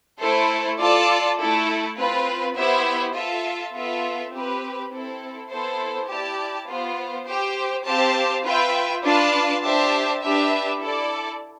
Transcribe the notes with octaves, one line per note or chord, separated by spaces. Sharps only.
A3 E4 A4 C5
F4 A4 D5 A5
A3 E4 A4
C4 F4 B4
B3 E4 G4 C5 E5
F4 A4 E5 A5
B3 F4 A4 E5
C4 G4 B4
C4 E4 A4
B3 E4 A4 C5
E4 G4 D5 A5
B3 F4 C5
G4 C5 G5
C4 G4 C5 F5 A5
F4 B4 E5 G5
D4 F4 B4 F5 A5
D4 G4 C5 E5 A5
D4 G4 B4 E5
E4 A4 D5